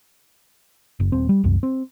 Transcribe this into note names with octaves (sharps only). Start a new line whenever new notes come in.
F#1
D#1 C4
G3
C2 F#2
C4